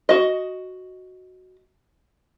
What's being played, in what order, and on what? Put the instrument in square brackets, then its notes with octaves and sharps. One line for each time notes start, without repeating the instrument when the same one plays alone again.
[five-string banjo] F#4 D#5